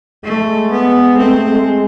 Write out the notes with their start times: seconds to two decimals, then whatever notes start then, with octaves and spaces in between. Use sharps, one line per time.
0.24 G#3 A3
0.71 B3
1.17 A3 C4
1.49 G#3